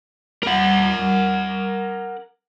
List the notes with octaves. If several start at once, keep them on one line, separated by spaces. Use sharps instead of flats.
A#4 F#5